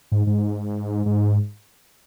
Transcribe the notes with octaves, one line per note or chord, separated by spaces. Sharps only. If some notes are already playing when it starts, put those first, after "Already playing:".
G#2
G#2
G#2